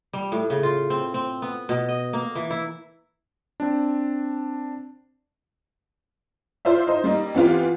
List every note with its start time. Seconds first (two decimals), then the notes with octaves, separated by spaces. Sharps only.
0.13 G3
0.32 A2
0.50 C#3
0.63 F4
0.90 C4
1.14 C4
1.42 B3
1.69 B2
1.89 D#5
2.13 A#3
2.35 E3
2.51 E4
3.60 C4 D4
6.65 F4 C5 D5 E5
6.87 D#4 C5
7.04 G3 A#3 D#4
7.34 E3 B3 C4 F4 G4